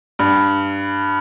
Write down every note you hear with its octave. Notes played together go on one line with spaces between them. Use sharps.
G2